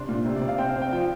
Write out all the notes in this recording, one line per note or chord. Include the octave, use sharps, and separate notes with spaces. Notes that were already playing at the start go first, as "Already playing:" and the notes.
Already playing: C3 D4 C6
A#2
C3
D5
C3
F5
C4 G5
F5
C4
G5
F3 G5